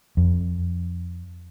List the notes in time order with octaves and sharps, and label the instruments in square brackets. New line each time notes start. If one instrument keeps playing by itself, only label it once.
[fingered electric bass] F2